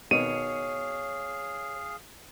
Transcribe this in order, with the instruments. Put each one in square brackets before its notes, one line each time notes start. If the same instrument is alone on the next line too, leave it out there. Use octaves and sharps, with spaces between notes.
[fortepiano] B2 D#3 [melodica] G#4 F5 [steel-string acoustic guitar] C#5 [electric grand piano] D#7